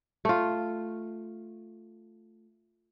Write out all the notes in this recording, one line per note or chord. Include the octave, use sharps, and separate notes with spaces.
A3 F4